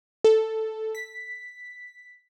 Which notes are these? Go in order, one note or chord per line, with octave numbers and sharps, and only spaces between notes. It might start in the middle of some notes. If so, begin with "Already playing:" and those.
A4
B6